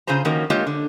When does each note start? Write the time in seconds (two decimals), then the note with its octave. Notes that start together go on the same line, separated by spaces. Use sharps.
0.07 C#3 F4 G#4 C5 A#5
0.25 D#3 F3 A#3 C#4 F#4 A#4
0.50 G#3 A#3 F4 G4 C#5
0.67 D3